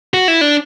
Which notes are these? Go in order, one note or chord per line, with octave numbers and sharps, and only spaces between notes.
F#4
E4
D4